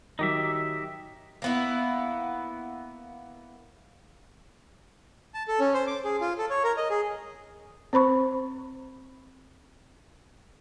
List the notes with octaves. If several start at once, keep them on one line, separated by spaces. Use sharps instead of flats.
D#3 F#3 D#4 G4 E5
A#3 B3 E4
A5
A4
C#4
C5
D6
G#4
F4
A4
C#5
A#4
D#5
G#4
C4 C5 B5 C#6